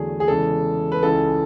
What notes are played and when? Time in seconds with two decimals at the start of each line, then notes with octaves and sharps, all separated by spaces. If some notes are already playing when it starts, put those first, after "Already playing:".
Already playing: E2 D3 F#3 A3 G#4
0.20 G#4
0.28 E2 C#3 G#3 A4
0.92 B4
1.03 C#2 C#3 E3 G#3 A4